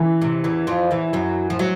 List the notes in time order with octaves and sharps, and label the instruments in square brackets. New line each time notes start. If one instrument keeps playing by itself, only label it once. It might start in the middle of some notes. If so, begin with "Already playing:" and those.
Already playing: [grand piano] E3
[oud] C3
E2 E3
F2 F3
E2 E3
F#2 F#3
F3
F#3